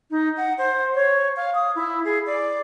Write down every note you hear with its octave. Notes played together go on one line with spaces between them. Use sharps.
D#4
F#5
C5
C#5
F5
D#6
E4
G#4
D5